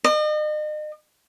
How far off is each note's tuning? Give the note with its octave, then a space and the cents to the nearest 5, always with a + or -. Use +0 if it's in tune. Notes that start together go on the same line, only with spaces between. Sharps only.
D#5 -40